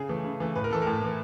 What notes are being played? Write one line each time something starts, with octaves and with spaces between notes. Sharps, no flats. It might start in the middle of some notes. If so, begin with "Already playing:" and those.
Already playing: C#3 G#4
E3 A3
C#3
E3 A3
A2 B4
A#4
E3 A3 A4
A#4
A2
E3 A3